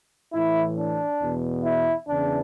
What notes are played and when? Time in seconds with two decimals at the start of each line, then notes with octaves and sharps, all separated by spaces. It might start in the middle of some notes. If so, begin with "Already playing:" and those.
0.34 A2 E3 E4
0.77 D4
1.21 E2 B2
1.65 E4
2.09 E2 C#3 E3 D4